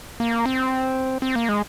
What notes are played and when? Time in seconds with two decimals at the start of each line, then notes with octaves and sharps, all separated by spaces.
0.20 A#3
0.46 C4
1.22 C4
1.35 A#3
1.49 G#3